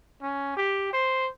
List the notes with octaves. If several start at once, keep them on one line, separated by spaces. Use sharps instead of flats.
C#4
G4
C5